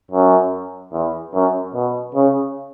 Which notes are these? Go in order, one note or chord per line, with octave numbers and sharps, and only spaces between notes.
F#2
E2
F#2
B2
C#3